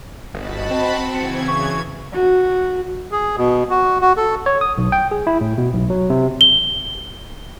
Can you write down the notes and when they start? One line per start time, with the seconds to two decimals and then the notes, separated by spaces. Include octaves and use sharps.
0.34 G1 F#4 D#5 A5 B5
0.71 C4
1.14 C#3 E3 G#6 C#7
1.48 C#6
2.13 F#4
3.12 G#4
3.37 B2
3.70 F#4
4.01 F#4
4.17 A4
4.46 C#5
4.61 D#6
4.78 B1
4.92 G5
5.11 G#4
5.27 E4
5.41 A2
5.58 B2
5.73 B1
5.90 F#3
6.10 C3
6.41 G7